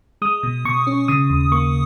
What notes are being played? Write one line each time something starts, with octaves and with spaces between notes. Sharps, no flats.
G#3 D#6
B2
B2 C#6
C#4
C#3 D#6
D#2
A#3 C#6